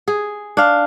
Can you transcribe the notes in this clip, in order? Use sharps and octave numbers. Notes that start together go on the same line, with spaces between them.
G#4
D4 F5